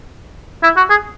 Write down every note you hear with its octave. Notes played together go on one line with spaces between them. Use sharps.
E4
F#4
G#4